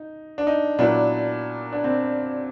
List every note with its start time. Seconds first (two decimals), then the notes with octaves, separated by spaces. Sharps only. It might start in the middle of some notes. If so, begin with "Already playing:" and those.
Already playing: D#4
0.38 D4
0.47 D#4
0.79 A#2 F#3 B3 D4 E4
1.73 D4
1.84 C4